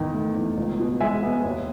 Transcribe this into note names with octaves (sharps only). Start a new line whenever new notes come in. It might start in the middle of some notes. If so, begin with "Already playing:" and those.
Already playing: E2 D#3
A3
E2
C#2
B2
G#3 E5 G#5
B3
D#2